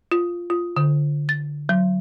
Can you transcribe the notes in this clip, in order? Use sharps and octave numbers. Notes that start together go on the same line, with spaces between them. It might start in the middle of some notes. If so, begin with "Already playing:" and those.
F4
F4
D3
A6
F#3